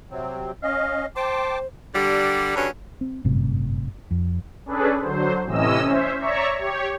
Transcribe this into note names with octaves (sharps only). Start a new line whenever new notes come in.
C3 F#3 C4
C#4 D#5 F5
C5 G5 A5 C6 D6
D3 G3
G2 D3 F#3 C#4
C4
G1 F#2 A2 C3
F2
C#4 D4 G#4 A4 B4
D3 F#3 C5
A2 C3 E3 C#4 D#5 E6
C#4 C5 E5
C#5 D5 E5 A#5 C#6
G4 C#5